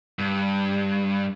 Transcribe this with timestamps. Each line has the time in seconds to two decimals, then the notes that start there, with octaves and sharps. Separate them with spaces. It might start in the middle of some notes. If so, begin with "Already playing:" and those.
0.19 G2